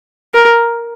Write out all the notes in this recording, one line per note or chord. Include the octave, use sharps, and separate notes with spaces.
A#4